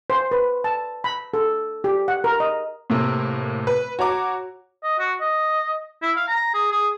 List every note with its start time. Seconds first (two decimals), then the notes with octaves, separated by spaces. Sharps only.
0.10 C5
0.31 B4
0.64 A5
1.04 B5
1.34 A4
1.84 G4
2.08 F#5
2.24 A#4
2.40 D#5
2.90 A2 C3 A#3
3.67 B4
3.99 F#4 C#5 A#5 D6
4.83 D#5
4.99 F#4
5.20 D#5
6.02 E4
6.16 F5
6.28 A#5
6.54 G#4
6.72 G#4